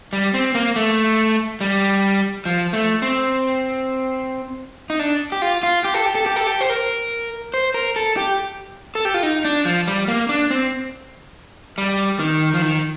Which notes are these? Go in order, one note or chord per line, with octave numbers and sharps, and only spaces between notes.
G3
C4
A#3
A3
G3
F3
A3
C4
D#4
D4
G4
F4
F4
G4
A4
G4
A4
G4
A4
G4
C5
A#4
C5
A#4
A4
G4
A4
G4
F4
D#4
D4
F3
G3
A#3
D4
C4
G3
D#3
F3
D#3